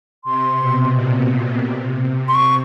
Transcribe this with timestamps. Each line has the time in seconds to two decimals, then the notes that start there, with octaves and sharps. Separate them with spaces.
0.25 C3 C6
0.59 B2
0.94 A#2
1.29 A#2
1.65 C3
2.28 C6
2.35 C#6